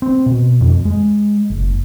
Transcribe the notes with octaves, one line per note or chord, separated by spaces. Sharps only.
C4
B2
F2
G#3
F#1